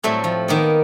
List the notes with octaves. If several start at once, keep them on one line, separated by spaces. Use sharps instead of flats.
A2 F#3 G3 A3 C4
F3
D#3 A#3 B3